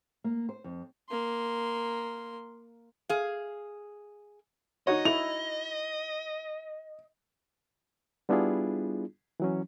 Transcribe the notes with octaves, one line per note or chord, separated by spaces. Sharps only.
A#3
C5
F2
A#3 C6
G#4 F5
D#4 F#4 C#5 D#5
E4 F7
G3 B3 D4 E4 F4 G#4
E3 F#3 C#4